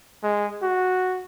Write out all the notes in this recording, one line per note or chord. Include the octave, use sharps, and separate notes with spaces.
G#3
F#4